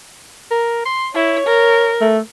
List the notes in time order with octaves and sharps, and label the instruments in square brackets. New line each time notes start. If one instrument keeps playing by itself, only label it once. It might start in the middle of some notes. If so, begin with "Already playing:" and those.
[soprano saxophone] A#4
C6
[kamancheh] E4 [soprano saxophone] C#5
[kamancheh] A#4
[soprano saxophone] A3